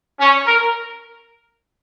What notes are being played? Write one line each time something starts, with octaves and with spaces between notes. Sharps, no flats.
C#4
A#4